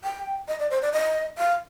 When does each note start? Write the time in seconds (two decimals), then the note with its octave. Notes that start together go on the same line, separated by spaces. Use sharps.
0.04 G5
0.48 D#5
0.59 D5
0.71 C5
0.82 D5
0.93 D#5
1.38 F5